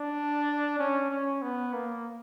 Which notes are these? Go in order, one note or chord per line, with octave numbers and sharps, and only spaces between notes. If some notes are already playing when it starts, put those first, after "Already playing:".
Already playing: D4
C#4
C#4
B3
A#3